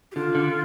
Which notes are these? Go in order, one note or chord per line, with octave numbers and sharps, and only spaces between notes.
G4
D3 F4
D3